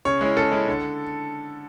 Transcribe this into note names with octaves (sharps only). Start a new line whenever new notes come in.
C#3 C#5
G#3 C#4 E4
C#3 A4
G#3 C#4 E4
D3